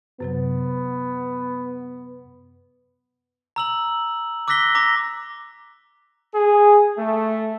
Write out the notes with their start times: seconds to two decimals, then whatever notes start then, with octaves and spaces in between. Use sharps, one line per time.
0.20 F#2 C3 F#3 B3
3.56 A#5 E6 F#7
4.48 D6 E6 F#6 A#6 B6 G7
4.75 A#5 D6 A#6
6.34 G#4
6.98 A3